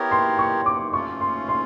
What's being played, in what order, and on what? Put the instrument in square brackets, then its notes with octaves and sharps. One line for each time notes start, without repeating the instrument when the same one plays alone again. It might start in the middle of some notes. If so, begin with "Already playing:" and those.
Already playing: [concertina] B3 E4 G4 A#4 C#5
[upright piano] C6
C#6
D6
[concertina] A3 C#4 F4 [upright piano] C#6
[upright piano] C6
C6